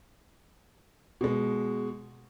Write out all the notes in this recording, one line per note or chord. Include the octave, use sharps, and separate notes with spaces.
B2 G#3